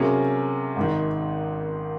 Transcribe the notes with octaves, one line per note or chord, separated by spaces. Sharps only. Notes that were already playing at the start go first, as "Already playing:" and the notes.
Already playing: C3 F#3 A#3 C#4 G#4
G#1 G#2 D#3